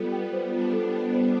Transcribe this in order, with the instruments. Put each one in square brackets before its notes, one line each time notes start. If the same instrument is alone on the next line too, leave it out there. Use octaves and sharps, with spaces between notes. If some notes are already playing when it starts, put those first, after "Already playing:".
Already playing: [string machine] G3 B3 [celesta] F4 A4
[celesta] G5
C5
[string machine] B3 D4 [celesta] F4
[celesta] A4
G5
C5